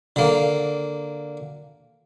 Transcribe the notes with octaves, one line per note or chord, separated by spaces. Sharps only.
D3 A#3